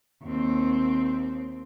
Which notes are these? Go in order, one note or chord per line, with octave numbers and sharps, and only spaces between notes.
D#2 C4